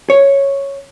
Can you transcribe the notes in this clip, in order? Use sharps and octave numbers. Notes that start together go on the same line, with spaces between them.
C#5